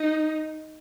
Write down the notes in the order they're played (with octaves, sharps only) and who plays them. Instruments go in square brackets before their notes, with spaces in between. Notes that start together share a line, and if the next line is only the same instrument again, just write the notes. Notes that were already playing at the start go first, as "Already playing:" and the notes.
Already playing: [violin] D#4